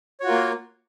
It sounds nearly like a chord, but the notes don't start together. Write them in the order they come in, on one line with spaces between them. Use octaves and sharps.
C#5 F#4 F4 A#4 A#3